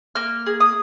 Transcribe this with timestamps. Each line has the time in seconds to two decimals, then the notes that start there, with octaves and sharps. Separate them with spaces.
0.15 A#3 F6
0.46 G#4
0.60 D#6